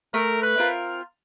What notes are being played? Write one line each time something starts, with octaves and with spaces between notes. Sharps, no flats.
A3 A#4
B4
C4 F4 A#4